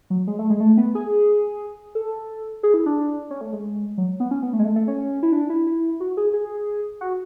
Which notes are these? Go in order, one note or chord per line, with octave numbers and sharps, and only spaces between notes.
F#3
G#3
A3
G#3
A3
B3
G#4
A4
G#4
E4
D4
C#4
A3
G#3
F#3
B3
C#4
B3
A3
G#3
A3
A3
C#4
E4
D4
E4
E4
F#4
G#4
G#4
F#4